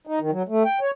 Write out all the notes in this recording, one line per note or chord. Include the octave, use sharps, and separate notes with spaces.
D#4
D#3
F#3
A3
G5
C#5